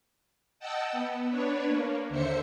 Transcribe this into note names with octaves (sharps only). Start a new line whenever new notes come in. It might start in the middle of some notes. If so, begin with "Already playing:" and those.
D#5 F#5 G5 A5 E6
B3
D4 B4 C#5
A#3
D#2 D3 C5 E5 C#7